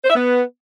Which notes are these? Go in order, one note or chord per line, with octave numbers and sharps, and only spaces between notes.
C5
E5
B3